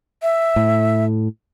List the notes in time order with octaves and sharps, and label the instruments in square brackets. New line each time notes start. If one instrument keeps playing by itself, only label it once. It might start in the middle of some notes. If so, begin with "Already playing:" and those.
[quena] E5
[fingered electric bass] A2